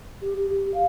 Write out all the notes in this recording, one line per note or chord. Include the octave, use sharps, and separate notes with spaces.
G4
G4
G4
F5